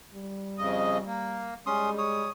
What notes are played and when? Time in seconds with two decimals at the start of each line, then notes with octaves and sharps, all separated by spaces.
0.14 G3
0.58 F2 C#3 D#5
1.06 A#3
1.66 G3 G#3 C#4 C6 D#6
1.98 C#5 D#6